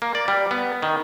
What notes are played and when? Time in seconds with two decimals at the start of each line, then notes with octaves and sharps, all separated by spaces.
0.02 A#3
0.15 D5
0.28 G3
0.51 B3
0.82 D#3